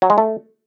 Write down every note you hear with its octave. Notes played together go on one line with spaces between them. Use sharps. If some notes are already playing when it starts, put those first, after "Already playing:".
F#3
G#3
A3